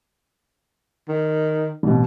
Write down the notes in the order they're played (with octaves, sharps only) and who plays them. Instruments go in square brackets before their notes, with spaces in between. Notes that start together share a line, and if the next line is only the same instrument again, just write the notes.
[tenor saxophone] D#3
[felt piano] A1 B2